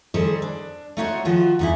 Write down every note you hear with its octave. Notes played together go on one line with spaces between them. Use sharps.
D#3 G3 G#4 A4 C5
D4
A3 D#4 E4 F#4 C5 C#5
D#3 F3 F4 F#4
E2 D#4 E4